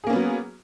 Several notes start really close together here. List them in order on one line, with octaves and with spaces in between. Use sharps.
G#4 A#3 C#4 B3 F#3